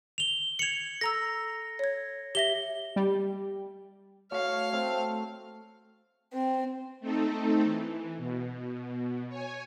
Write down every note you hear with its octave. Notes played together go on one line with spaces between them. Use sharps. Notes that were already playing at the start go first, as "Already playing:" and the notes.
F7 G7
G#6 C#7 F7 F#7
A4 A#5 E6 A#6
C#5 G#6
G4 E5 A#6 G7
G3
A3 F#4 C#5 F5
A3 C4
C4
A3 C4 D#4 A4
E3
B2
C#5 G#5